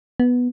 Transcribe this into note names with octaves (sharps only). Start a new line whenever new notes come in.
B3